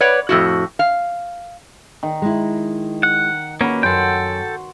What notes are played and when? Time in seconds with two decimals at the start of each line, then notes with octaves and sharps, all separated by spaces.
0.01 B4 C#5 D5 F#5
0.29 F2 A2 F#4
0.79 F5
2.03 D#3
2.22 G#3 E4
3.03 F#5
3.61 A#3 C#4 F#4 B4
3.83 F#2 A4 F#5 G5 C6